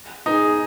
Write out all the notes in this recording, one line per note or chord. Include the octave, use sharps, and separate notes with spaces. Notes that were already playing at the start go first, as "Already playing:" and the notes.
D#4 G#4